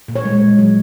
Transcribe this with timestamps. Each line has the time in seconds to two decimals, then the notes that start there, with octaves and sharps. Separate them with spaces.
0.08 A#2
0.16 C#5
0.25 G#3
0.42 A#2
0.59 F#3